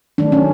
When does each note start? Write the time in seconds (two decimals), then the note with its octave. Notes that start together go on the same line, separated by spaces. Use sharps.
0.18 D#3 F#3 A3 D4
0.32 C#4